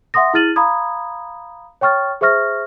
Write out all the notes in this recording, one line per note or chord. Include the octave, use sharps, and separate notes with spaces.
E5 F#5 C6 D#6 A#6
E4 G#4 F6 A6 D#7 F#7
F5 A#5 B5 D#6 G#6
C#5 G5 C#6 F6 A6
G#4 C5 E5 C#6 F6 A#6